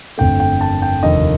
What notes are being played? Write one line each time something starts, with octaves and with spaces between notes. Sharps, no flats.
G1 F2 D3 A3 G5
G5
A5
G5
F1 D#2 D3 F3 D#5